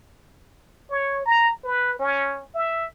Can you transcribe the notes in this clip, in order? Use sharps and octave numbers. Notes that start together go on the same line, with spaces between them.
C#5
A#5
B4
C#4
E5